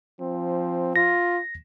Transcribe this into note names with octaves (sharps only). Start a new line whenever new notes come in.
F3 C4
F4 A#6